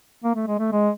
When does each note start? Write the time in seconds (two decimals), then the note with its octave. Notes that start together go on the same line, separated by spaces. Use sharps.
0.24 A#3
0.35 A3
0.47 G#3
0.59 A3
0.72 G#3